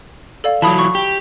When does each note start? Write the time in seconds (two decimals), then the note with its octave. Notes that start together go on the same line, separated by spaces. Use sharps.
0.44 A4 D5 F5
0.62 E3 F#3 A5 B5 D#6
0.79 C#6
0.95 G4